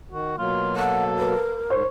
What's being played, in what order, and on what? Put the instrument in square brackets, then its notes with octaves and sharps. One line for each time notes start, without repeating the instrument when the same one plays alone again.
[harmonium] D#3 [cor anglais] F#4
[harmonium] B2 F#3 A#3 [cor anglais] F4
[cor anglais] A4 [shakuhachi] F#5
[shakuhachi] A#4 [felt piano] B4
[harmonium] G#2 [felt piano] C5 [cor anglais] C#5